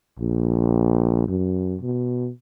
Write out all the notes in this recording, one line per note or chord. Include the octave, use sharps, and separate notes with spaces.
A#1
F#2
B2